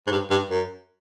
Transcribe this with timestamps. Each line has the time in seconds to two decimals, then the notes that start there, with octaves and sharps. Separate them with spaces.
0.07 G#2
0.11 G2
0.30 G2
0.50 F#2